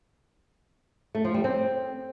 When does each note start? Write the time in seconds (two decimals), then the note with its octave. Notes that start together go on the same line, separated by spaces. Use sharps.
1.15 A3
1.24 F3
1.34 G3
1.44 C4